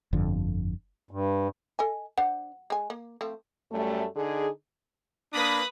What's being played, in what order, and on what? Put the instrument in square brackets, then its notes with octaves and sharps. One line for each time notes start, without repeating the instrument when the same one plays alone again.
[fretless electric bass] G1 F2 D3
[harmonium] G2
[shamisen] A4 D#5 G#5
[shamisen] D4 C5 [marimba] F#5
[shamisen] G#3 G#5
A#3
F3 A3 C4
[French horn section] F#2 G3 A3
D3 D#4 G#4
[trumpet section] A#3 D4 [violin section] B4 B5 D#6